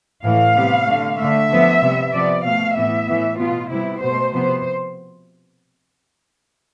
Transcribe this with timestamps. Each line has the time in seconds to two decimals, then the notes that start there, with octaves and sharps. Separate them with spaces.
0.24 A2 E3 A3 F5
0.55 C3 G3 B3
0.88 D3 A3
1.18 D3 A3 E5
1.50 D3 F3 B3
1.82 C3 G3 B3
2.13 C3 F3 B3 D5
2.44 B2 A3 F5
2.75 A2 E3 B3 E5
3.07 A2 E3 B3
3.39 B2 B3 F4
3.70 C3 G3 B3 E4
4.01 B2 A3 C5
4.33 C3 F3 B3 C5